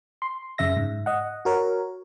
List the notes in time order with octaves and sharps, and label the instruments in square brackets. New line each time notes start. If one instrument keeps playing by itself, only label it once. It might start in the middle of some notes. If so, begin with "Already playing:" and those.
[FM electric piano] C6
F#2 C#3 E5 A#6
G#2
D#5 F#5
F#4 A#4 C#5